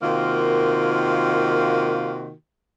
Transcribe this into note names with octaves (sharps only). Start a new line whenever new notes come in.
C3 D#3 A#3 F4 F#4